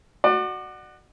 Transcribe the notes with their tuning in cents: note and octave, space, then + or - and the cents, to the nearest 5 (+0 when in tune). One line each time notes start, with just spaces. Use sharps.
F#4 +0 D5 +35